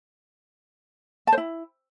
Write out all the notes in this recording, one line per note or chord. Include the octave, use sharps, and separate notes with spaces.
A5
C5
E4